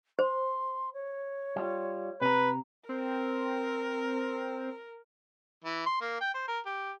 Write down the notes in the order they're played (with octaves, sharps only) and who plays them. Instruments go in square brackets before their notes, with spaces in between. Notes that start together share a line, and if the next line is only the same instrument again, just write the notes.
[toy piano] C5 [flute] C6
[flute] C#5
[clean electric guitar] G3 F4
[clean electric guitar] C3 A#5 [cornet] B4
[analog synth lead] C4 [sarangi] A#4
[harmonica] E3
C6
A#3
G5
C5
A#4
G4